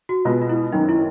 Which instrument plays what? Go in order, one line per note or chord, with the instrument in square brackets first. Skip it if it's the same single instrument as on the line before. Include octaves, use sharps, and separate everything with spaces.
[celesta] F#4
[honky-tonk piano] B2 G#3 B3 [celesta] F4
[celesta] F4
E4
[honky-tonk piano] F#1 F#2 D#3 [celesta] D#4
[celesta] E4